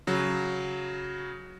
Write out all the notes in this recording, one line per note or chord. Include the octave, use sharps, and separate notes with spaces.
C#3 F#3